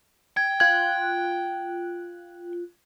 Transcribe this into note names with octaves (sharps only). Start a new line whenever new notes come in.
G5 G#6
F4 F#6 G#6